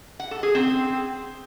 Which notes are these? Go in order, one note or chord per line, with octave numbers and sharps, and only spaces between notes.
F#5
A4
G#4
C4